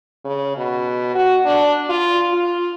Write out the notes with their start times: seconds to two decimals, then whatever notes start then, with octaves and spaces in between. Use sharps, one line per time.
0.25 C#3
0.57 B2
1.15 F#4
1.45 D4
1.89 F4
2.33 F4